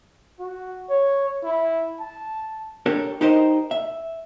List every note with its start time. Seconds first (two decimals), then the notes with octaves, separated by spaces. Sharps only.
0.39 F#4
0.90 C#5
1.44 E4
2.00 A5
2.86 D4 G4 A4 A#4 C#5
3.21 D#4 G4 A#4 C5 D#5
3.71 E5